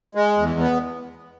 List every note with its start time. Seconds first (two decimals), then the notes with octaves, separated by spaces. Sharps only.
0.15 G#3
0.37 E2
0.60 B3